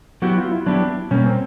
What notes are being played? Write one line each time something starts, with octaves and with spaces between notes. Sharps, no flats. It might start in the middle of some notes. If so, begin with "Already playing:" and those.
F#3 B3 E4 F#4 G4
F4
E4
F#3 B3 D4 E4 G4
B2 G3 A#3 C#4
C4